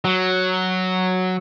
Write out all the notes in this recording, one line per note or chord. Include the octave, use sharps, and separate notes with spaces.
F#3